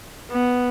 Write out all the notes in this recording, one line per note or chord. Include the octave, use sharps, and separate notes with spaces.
B3